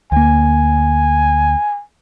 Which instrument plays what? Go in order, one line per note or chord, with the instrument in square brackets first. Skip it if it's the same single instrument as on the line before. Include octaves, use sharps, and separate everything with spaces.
[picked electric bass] D2 A#3 [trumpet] G#5